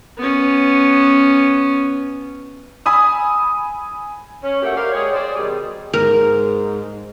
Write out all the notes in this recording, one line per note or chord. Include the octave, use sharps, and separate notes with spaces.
B3 C#4
G#5 B5 D#6 E6
C#4
A3 A#3 F#4 G4
G4 A#4 C5 D5 F5
G#3 G4 G#4 C#5
G#4 C5 D5
B2 D#3 G3 G#4
G#2 A#4